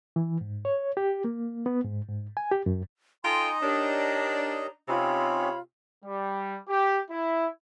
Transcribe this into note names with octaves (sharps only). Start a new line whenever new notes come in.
E3
G#2
C#5
G4
A#3
B3
G#2
G#2
G#5
G4
F#2
D#4 F4 A4 D#5 G5 G#5 A#5 C6
D4 G4 A#4 C#5
C3 C4 C#4 D#4 F4 C#5 B5
G3
G4
E4